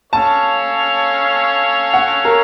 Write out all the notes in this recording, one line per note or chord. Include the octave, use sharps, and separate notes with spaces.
C#4 A4 C#5 F5 A5
F#5
A#4